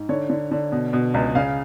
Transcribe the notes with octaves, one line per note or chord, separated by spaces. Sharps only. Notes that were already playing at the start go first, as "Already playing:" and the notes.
Already playing: G#2
D3 C#5
D3
D3
B2
B2
C#2
C#3 F5